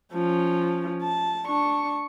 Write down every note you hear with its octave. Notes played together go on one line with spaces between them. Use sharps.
F3 C#4
A5
D4 C#6